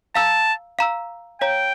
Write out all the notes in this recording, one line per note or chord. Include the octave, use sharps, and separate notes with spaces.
F5 A5 A#5 E6
F5 A#5 E6
C#5 F5 G5 A#5